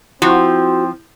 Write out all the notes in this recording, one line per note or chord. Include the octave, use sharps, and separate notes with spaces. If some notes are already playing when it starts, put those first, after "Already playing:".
F3 C4 E4 F#4